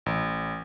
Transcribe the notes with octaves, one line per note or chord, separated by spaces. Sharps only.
A1